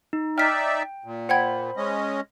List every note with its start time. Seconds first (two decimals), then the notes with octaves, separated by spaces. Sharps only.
0.13 D#4
0.38 D#4 D5 E5 G5 F6 B6
1.04 A#2
1.29 C5 F#5 G5 B5 G#6
1.77 G#3 C#4 D#5